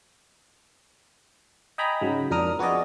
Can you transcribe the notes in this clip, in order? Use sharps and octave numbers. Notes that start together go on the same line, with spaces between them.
D#5 G5 G#5 A#5 B5
G#2 C#3 F#3
F2 D4 A#4 D#6 F6
B3 F#4 G#4 D5 D#5